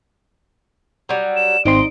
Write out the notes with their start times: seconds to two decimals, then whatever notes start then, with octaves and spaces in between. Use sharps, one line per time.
1.09 F#3 G3
1.36 E7
1.65 G#1 C4 D#4 D#5 C6 D7